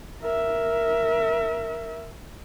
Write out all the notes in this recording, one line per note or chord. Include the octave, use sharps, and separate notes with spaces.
A#4 E5